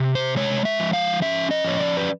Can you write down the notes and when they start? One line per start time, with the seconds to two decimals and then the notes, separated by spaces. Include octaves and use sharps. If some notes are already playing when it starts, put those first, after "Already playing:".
Already playing: C3
0.15 C5
0.36 G#3 C#5
0.65 E5
0.79 F3
0.93 F5
1.22 C#4 E5
1.51 D#5
1.64 F3 C#5
1.79 D5
1.97 B4